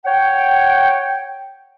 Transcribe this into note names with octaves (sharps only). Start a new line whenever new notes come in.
C#5 F#5 G5